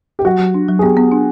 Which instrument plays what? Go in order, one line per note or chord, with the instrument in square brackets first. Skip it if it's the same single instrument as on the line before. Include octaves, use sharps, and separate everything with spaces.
[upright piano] G4
[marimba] F#3 [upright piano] F#4
[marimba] F#3
D4
F#3
[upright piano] G#4
[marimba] B3 [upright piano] G4
[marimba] B3
D4